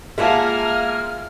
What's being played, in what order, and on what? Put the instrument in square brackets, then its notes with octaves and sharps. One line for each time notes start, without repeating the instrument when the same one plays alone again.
[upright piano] G#3 F4 [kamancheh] A#3 G#5 [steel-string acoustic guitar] E5 F#5 A5 [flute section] F6